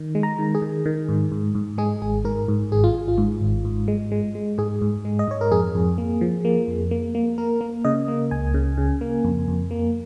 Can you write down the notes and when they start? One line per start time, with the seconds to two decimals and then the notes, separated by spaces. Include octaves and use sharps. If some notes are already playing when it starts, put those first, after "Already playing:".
Already playing: D#3
0.15 G#3
0.23 A#5
0.38 D#3
0.55 G#4
0.62 D#3
0.86 D#3
1.08 G#2
1.32 G#2
1.55 G#2
1.78 G#3 G#4
2.02 G#1 G#4
2.25 G#2 A#4
2.48 G#2
2.72 G#1 G#4
2.84 F4
2.95 G#1
3.08 F4
3.18 G#2
3.41 G#1
3.65 G#2
3.88 G#3
4.12 G#3
4.35 G#3
4.58 G#2 G#4
4.82 G#2
5.05 G#3
5.19 D#5
5.28 G#2 C#5
5.41 A#4
5.51 F2 G#4
5.75 F2
5.98 A#3
6.21 F3
6.45 A#3
6.68 F2
6.91 A#3
7.15 A#3
7.38 A#3 A#4
7.61 A#3
7.85 C#3 D#5
8.08 A#3
8.31 C#2 G#5
8.54 C#3
8.78 C#3
9.01 A#3
9.25 F2
9.48 F2
9.71 A#3